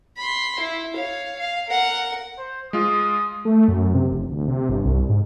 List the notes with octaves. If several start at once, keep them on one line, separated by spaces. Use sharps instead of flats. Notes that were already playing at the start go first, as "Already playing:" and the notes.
B5 C6
E4
C#5 F5
F5
A#4 F#5
C5
G#3 F4 D#6
A3
F#2
C3
F1
D2
C3
G1
C2
G#2